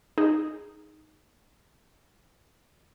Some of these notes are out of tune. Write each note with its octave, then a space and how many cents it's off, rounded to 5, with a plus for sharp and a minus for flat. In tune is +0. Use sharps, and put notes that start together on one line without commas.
D#4 +0 G#4 +0